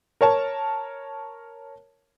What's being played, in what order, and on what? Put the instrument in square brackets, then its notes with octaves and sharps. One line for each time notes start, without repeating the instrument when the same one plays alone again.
[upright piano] A#4 C#5 A5